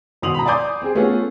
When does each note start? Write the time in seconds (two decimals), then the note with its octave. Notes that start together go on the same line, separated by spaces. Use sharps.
0.22 G#1 B2 C6 D#6 F7 F#7
0.34 A#5 B5
0.46 D5 G#5 C6 D6 D#6 G6
0.82 C4 G4 G#4
0.95 A3 B3 C#4 F4 G#4